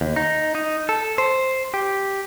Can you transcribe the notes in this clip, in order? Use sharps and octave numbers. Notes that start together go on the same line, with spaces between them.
D#2
D#4
D#4
A4
C5
G4